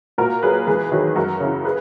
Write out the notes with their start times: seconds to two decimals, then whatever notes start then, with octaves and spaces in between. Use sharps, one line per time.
0.18 A#2 F#4 A#4
0.43 F#3 G#4 B4
0.67 E2 G#4 B4
0.91 D#3 F#3
1.16 F#2 F#4 A#4
1.40 C#3 E3
1.64 G#4 B4